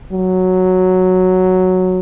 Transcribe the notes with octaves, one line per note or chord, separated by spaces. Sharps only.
F#3